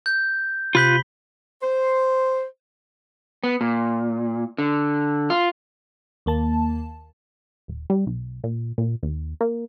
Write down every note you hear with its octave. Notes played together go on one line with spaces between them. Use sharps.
G6
C3 F4 B5 F#6 G6 B6 G7
C5
B3
A#2
D3
F4
D#2 A#3 A5
D#1
G3
B1
A#2
A#2
D#2
A#3